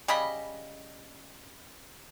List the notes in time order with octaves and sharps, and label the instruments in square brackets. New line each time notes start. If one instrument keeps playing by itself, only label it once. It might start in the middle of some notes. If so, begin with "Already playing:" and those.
[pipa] C#3 G3 D#5 B5